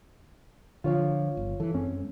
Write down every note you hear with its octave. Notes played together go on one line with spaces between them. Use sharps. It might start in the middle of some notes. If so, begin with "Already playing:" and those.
D3 E3 F3 F4 C#5 F5
G1
E3 A4
F#2 G#3 C4 C#4